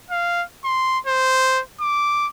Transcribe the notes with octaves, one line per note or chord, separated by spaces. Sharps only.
F5
C6
C5
D6